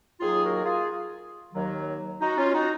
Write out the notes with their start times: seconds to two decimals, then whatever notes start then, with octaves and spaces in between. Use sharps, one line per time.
0.20 D#2 D#3 F#3 F4 G#4
0.43 F#4 A#4
0.64 F4 G#4
1.53 D#2 D#3 F#3
2.21 D#4 F#4
2.38 C#4 F4
2.53 D#4 F#4